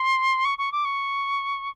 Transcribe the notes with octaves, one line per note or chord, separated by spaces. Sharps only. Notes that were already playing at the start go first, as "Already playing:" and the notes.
Already playing: C6
C#6
C#6
D6
C#6